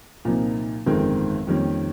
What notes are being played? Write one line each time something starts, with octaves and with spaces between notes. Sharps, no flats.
C2 A#2 F3 A#3 D#4
G1 F2 D#3 G#3 C4
F2 D#3 G3 A#3 C#4